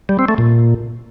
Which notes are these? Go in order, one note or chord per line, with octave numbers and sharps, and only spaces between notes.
G3
C4
A3
A#2